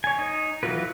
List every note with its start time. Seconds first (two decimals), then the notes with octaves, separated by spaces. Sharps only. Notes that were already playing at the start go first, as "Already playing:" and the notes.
0.04 C#5 G#5
0.19 D#4
0.63 E3 F#3 F4 F#4 B4